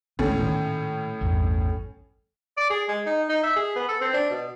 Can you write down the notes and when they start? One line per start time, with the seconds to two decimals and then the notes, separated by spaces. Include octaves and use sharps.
0.19 G#1 D2 A2 D3 C#4
0.37 A#2 D#3
1.21 A1 E2 G2
2.57 D5
2.70 G#4
2.88 G#3
3.06 D#4
3.29 D#4
3.43 E5
3.56 G#4
3.76 B3
3.88 A4
4.01 C4
4.13 D4
4.30 B2